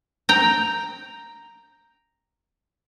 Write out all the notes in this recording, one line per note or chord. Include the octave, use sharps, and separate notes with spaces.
G5 A#5